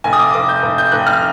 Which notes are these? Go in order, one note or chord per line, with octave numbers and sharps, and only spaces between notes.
F1 G#5
D#6
D6
F1 D6
G6
F1
G6
F1 F#6
F6